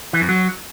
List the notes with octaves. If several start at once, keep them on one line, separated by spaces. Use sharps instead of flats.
E3
F2
F#3